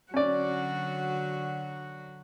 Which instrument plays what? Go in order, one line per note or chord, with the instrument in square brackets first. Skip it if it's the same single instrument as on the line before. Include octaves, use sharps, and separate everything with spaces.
[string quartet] D3 F#3 F#4 [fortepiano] C#4 D5